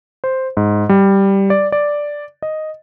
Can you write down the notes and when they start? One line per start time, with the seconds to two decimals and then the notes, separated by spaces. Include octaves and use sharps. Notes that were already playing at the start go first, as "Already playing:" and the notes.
0.24 C5
0.57 G#2
0.89 G3
1.50 D5
1.72 D5
2.42 D#5